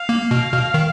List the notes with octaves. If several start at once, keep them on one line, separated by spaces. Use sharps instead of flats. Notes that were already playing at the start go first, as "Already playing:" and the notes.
Already playing: F5
A#3
B2
B2
D#3